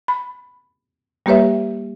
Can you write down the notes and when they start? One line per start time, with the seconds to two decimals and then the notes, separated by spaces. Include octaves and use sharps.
0.08 B5
1.26 G3 A#3 G4 B4 C#5 E5